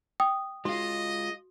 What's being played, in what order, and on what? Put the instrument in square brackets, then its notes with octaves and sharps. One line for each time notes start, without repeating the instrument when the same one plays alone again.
[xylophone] G5 [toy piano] D#6
[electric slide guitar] G#3 F4 [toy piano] F#4 [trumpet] D#5